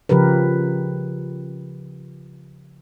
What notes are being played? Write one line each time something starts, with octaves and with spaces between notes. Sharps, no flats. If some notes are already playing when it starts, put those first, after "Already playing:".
C#3 F3 G4 A#4 B4